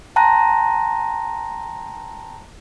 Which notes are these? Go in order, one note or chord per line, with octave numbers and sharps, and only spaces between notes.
G5 A5 A#5 C6 F#6 A#6